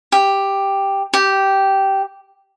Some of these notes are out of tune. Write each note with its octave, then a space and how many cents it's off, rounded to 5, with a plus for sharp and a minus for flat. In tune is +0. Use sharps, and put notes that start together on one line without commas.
G4 +5
G4 -10